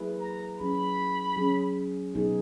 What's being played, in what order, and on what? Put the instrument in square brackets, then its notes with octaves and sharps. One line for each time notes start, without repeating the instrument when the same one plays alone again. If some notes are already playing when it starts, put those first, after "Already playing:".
Already playing: [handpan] F#3 A#3 E4 G#4 B4
[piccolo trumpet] A#5
[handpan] F#3 C#4 G#4 [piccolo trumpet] B5
[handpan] F#3 C#4 G#4
B2 F#3 B3 D#4 G#4